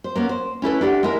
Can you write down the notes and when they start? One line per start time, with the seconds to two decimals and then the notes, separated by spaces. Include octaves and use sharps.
0.04 C5
0.16 A#3 B3 C#4
0.29 C5
0.62 C#4 E4 A4 B4
0.81 D4 G4 F#5
1.03 G#3 E4 A#4